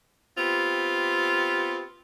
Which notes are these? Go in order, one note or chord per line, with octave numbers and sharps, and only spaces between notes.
B3 C4 F4 G4